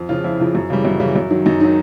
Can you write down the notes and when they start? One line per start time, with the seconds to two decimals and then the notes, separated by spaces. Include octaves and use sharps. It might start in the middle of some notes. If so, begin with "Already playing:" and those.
Already playing: F2
0.09 C#3 F3 F4
0.24 F2 E4
0.40 C#3 F3
0.55 F#2
0.70 C#3 E3 G3
0.85 F#2
1.00 C#3 E3 G3
1.15 F#2
1.30 D#3 F#3
1.46 F#2 D#4
1.60 D#3 F#3 D#4